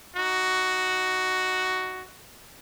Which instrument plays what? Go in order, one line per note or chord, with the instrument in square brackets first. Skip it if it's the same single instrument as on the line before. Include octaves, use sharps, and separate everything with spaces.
[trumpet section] D#4 F#4